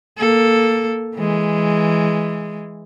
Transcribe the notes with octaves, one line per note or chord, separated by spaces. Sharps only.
A#3 A4
E3 G#3